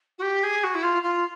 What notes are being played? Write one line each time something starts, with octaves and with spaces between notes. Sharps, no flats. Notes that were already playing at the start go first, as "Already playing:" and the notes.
F#4
G4
G#4
F#4
E4
F4
F4